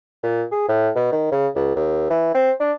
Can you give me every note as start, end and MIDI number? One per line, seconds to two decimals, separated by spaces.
0.23 0.44 46
0.52 0.64 68
0.69 0.90 45
0.96 1.12 47
1.12 1.28 51
1.32 1.48 49
1.55 1.71 37
1.76 2.10 39
2.10 2.33 52
2.34 2.52 60
2.60 2.72 62